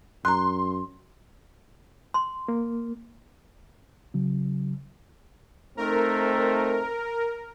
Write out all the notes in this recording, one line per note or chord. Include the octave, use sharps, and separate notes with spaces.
F#2 A#5 C6 F#6
C6
A#3
C#3 F#3
A3 C4 D#4 A#4